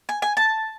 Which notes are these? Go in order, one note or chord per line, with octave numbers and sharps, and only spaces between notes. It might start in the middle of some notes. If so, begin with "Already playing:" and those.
G#5
G#5
A5